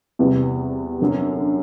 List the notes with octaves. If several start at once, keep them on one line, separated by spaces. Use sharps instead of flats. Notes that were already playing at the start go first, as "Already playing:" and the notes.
E2 C3 E3 G3 B3
F#2 D3 F#3